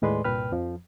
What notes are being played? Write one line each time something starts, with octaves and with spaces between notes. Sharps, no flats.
D#2 A2 G#3 B4 D5 C6
C2 G2 A#2 B4 G5 F6
F2 F3